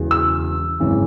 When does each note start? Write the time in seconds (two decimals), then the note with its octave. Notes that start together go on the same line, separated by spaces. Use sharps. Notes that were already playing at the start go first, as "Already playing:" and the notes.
Already playing: E1 E2 C#3 E3
0.11 E6
0.80 G#1 F#2 C#3 E3